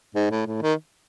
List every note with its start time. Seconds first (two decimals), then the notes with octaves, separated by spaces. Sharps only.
0.15 G#2
0.31 A2
0.46 A2
0.62 D#3